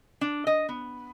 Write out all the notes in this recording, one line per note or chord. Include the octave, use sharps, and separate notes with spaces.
D4
D#5
B3